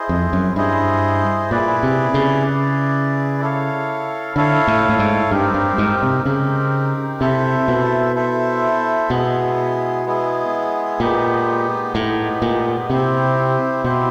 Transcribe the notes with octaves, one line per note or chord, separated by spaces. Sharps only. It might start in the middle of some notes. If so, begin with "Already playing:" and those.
Already playing: E4 G#4 C5 D#5
F2
F#2
G2 E4 G#4 C5 D#5
A#2 E4 G#4 B4 D5
C3
C#3
E4 G#4 B4 D5
E4 A4 C#5 F5
D3 E4 A4 C#5 F5
A2
A2
G#2
G2 C4 D#4 G4 A#4
G2
G#2
C3
C#3 C4 D#4 G4 A#4
C3 E4 A4 C5 E5
B2
E4 A4 C5 E5
B2 G#3 B3 E4 G#4
G#3 B3 E4 G#4
A#2 G#3 B3 D#4 G4
A2 G#3 B3 D#4 G4
A#2
C3 C4 E4 G4 C5
B2 C4 E4 G4 C5